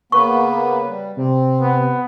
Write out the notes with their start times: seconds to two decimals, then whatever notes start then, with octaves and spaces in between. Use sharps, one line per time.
0.12 C#3 A#3 B3 B4 C#6
0.88 G3
1.17 C3 C4
1.61 B3